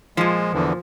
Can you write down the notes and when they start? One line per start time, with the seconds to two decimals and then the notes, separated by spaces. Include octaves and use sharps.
0.17 A#2 F3 G#3
0.53 E2 D3 E3